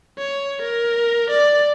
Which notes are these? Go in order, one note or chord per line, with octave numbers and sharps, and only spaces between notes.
C#5
A#4
D5